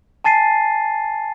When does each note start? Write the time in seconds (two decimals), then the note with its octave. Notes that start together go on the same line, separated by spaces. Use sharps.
0.24 G#5 A5 A6 C7 D#7